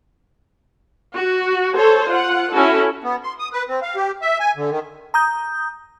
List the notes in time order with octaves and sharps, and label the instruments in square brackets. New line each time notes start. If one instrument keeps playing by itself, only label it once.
[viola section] F#4
A4 C5 C#5
F4 F#5
C#4 E4 F#4 A4
[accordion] B3
C6
D#6
B4
C4
F5
G4
E5
G#5
D3
D#3
[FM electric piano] A#5 D#6 G6